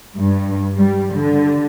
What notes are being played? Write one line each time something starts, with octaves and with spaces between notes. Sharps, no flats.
G2
G3
D3